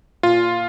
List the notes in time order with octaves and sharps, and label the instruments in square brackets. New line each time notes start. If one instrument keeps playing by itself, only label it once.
[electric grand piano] A#2 F4